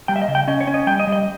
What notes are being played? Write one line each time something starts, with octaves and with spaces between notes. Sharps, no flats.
G3 G5
E5
D#5
C#3
G5
C#4 D#5
C#5
C#4
D#5
G3 G5
D#5
G3
D#5